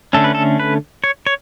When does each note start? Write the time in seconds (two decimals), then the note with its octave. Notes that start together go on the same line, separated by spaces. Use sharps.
0.13 D3 A3 C#4 A4
0.24 B4
0.35 A4
0.60 B4
1.04 C#5
1.27 C#5